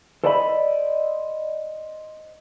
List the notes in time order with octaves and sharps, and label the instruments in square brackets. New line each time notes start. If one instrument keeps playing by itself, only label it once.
[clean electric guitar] A4 C5 D5 D#5 F5 B5